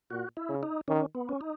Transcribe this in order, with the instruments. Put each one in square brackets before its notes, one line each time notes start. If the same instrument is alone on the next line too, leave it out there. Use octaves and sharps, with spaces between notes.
[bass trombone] A#2 [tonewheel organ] F#4
[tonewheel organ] E4
[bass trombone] C#3
[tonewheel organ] D#4
[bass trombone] D#3 [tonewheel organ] C#4
[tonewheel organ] B3
C#4
D#4